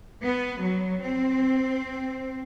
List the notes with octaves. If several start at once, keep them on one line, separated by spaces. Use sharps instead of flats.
B3
F#3
C4